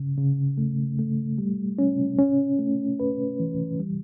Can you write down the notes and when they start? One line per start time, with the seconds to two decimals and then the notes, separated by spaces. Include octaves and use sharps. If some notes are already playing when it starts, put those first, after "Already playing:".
Already playing: C#3
0.18 C#3
0.58 A3
0.99 A3
1.38 G3
1.79 C#4
2.19 C#4
2.59 A3
3.00 B4
3.40 E3
3.80 G3